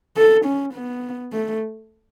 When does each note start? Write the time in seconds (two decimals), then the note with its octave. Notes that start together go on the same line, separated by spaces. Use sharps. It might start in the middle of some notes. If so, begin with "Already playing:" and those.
0.17 A4
0.45 C#4
0.74 B3
1.33 A3